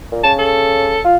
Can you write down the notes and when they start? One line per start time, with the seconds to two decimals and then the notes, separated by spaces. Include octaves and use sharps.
0.12 A#2
0.23 C#3 A5
0.39 A4
1.05 F4